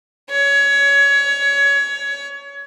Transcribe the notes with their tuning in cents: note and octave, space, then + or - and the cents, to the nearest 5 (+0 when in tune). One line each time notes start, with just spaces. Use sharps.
C#5 +25